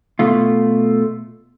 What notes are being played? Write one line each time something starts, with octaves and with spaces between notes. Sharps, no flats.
B2 A3 F4